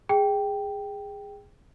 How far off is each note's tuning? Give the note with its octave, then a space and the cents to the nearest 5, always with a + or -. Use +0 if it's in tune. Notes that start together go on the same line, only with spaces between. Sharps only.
G#4 -15 G5 +0